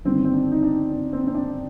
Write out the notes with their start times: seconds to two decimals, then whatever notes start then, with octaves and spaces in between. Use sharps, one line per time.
0.05 G1 G2 D#3 C4
0.25 C4
0.33 D4
0.52 D#4
0.63 D4
0.91 C4
1.13 C4
1.27 C4
1.34 D4